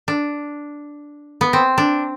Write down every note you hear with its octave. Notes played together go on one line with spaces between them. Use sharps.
D4
B3
C4
D4